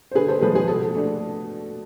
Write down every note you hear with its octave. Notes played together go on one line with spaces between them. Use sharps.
C5
D3 G#4 B4
A4 C5
F3 G#3 G#4 B4
G#4
B2 A4
A3 D4